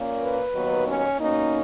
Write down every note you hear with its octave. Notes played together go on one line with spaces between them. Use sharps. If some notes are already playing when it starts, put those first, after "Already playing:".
Already playing: A#2 A#3 C#4
B4
D#2 D#3 F#3 B3
C#4
B2 A#3 C#4 D#4